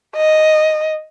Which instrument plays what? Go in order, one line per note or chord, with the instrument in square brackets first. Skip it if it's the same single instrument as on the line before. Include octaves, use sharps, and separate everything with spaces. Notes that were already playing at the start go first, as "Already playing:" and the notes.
[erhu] D#5